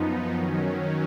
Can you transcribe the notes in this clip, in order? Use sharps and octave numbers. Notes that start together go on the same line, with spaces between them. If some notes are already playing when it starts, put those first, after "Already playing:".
Already playing: F#2 F3 B3 D#4
D#3 F#3 C#4